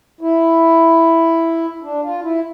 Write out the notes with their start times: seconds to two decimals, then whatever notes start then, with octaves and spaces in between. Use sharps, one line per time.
0.21 E4
1.83 D4
2.02 F4
2.22 E4